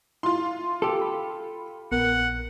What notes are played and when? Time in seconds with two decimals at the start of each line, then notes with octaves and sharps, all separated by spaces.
0.23 E4 F4 C6
0.82 G4 A4
1.02 B5
1.92 A#1 B3 A#4 F#5